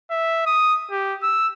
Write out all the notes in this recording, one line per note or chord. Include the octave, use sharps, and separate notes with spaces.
E5
D#6
G4
E6